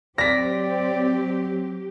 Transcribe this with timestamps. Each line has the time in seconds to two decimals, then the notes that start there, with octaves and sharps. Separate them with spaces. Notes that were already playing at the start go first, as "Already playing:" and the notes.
0.18 F#3 C4 G4 D5 A#6 B6